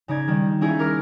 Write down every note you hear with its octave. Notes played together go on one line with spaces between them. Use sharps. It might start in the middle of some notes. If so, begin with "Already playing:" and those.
C#3 D#4 D5 G#6
D#3 G3
C#4 D#4 E4 G#4
A#4 D6 F6 A#6